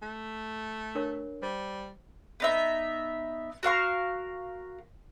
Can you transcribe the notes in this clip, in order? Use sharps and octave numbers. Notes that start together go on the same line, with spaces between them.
A3
D4 A#4 C#5
G3 C5
B3 D#4 E5
F#4 A#4 F5 C#6